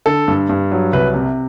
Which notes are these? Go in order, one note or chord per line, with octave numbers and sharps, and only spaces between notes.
D3 A4
G2
G2
F#3
C2 B4
C3